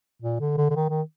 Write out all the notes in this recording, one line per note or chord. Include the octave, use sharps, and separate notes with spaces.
A#2
D3
D3
D3
D#3
D#3